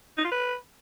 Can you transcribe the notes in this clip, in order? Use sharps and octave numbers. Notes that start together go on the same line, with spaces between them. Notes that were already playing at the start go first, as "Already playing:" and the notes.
D#4
F4
B4